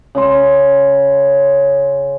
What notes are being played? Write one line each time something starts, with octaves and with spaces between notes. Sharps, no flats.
C#3 D5 C6